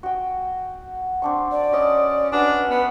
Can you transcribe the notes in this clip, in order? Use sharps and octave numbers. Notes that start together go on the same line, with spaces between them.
F#4 G5
C4 D4 C#6
D5
C#4 C#5 D#5
C#4 D4 F#4 B4
B3